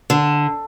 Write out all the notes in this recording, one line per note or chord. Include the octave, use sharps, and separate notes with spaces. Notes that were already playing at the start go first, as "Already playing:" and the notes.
D3